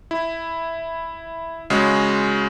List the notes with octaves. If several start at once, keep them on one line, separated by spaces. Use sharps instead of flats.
E4
C#3 G#3 F#4